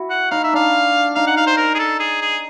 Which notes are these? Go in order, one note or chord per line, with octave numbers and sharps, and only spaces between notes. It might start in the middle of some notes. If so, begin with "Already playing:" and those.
Already playing: E4 F#4
F#5
D#4 F5
E5
D4 F5
D#4 F5
F#5
F5
C5
A#4
G#4
A4
G#4
G#4